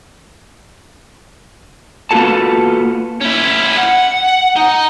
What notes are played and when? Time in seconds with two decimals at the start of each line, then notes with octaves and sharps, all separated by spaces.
2.11 A#3 B3 F4 F#4 A4 A5
3.21 C#4 E4
3.77 F#5
4.56 D#4